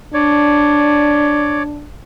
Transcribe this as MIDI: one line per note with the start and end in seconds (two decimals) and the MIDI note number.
0.14 1.87 62
0.14 1.63 73
0.14 1.63 74